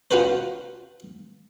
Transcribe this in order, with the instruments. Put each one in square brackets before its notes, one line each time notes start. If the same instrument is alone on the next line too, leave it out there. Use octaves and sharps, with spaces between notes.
[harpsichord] C#4 F4 F#4 B4 C5